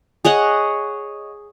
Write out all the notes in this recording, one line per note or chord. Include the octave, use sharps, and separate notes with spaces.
G#4 C#5 D#5 F#5